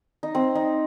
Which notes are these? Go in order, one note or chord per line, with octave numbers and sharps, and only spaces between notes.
D#4
C4
D#4